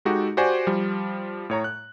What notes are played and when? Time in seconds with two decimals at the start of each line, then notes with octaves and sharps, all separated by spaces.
0.05 G#3 D#4 F#4 G4 A4
0.37 F#4 G4 C5 D5 G#5 C6
0.67 F3 G3
1.50 A2 C#5 A#5
1.64 F#6